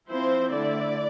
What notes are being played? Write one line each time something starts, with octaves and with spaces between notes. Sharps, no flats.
F3 C4 E4 C5
D3 A3 E4 D5